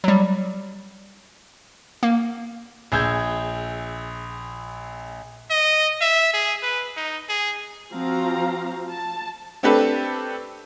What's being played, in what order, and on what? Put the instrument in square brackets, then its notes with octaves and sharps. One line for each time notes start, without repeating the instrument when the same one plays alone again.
[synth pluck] F#3 G3
A#3
[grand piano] A#1 G#4 E6 G6 G#6
[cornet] D#5
E5
G#4
B4
D#4
G#4
[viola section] F3 C4 F#4 F5 A#5
A5
[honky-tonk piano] A3 C4 D4 G4 A4 B4